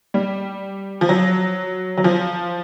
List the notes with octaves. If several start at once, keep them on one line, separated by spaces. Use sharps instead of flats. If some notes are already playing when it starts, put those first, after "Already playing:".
G3
F3
F#3
F#3
F3